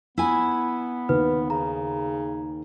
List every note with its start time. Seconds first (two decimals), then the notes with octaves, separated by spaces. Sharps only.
0.18 B3 E4 G#5
1.09 D#2 B4
1.50 C#3 A#5